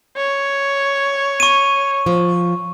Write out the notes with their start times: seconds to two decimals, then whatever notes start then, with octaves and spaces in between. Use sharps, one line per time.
0.17 C#5
1.40 C#6 D#7
2.06 F3